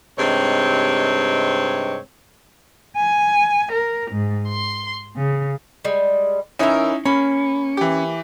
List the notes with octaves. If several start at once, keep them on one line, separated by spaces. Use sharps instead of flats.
G2 C3 G#3 C4 D#4 C#5
G#5
A#4
G#2
C6
C#3
G3 G#3
E3 C#4 D#4 E4 A#4
A#3 C#4 B5
E3 G4